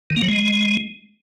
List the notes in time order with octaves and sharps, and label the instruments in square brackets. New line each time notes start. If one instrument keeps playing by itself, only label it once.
[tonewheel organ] D#3
A#3
F#3
G#3